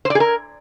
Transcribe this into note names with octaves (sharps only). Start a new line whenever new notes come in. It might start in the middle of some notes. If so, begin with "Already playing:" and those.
C5
D5
G#4
A#4